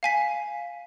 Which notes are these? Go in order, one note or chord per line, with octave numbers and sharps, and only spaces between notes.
F5 G#5 B6